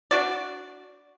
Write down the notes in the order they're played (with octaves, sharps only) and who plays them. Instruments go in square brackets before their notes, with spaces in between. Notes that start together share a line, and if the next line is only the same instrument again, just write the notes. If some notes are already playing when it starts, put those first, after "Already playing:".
[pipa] D4 F#4 D5